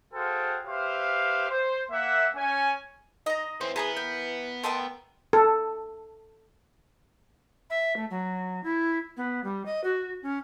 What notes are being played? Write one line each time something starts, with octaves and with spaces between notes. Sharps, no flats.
F#4 G#4 A4 C5 F5 G5
G4 B4 C5 E5 F5
C5
A#3 E5 F#5
C#4 G#5
D#4 D#5 A#5
E3 C4 C#4 C5
B3 G#4 A#4 G#5 B5 D#6
G5
A3 A#4 D#5 G5 A5 C6
A4
E5
A3
F#3
E4
B3
G3
D#5
F#4
C#4